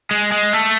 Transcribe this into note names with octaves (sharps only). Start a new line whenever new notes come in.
G#3
G#3
A3